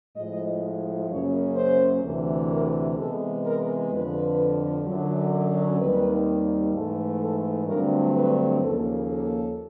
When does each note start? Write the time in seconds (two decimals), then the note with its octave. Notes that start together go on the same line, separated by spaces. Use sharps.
0.15 A2 F3 G#3 D#5
1.10 F#2 C#3 F#3 A#3 C#5
1.56 C5
2.04 D2 C3 E3
2.50 A#4
2.98 C3 E3 G#3 B3 A4
3.45 A#4
3.92 F2 D3 F3 B4
4.86 F#2 D3 F#3
5.79 D#2 D#3 G3 C4 B4
6.74 G#2 E3 A3 A4
7.21 A4
7.67 G2 D3 F#3 A3 C4 A#4
8.15 B4
8.62 D#2 C#3 F3 A#3 A4
9.09 A4